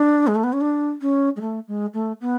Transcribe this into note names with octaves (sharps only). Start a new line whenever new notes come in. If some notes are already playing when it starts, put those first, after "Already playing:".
Already playing: D4
G#3
A3
B3
C#4
D4
C#4
G#3
A3
G#3
A3
B3